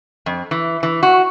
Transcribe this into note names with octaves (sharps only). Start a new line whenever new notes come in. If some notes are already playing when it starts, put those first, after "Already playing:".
F2
E3
E3
F#4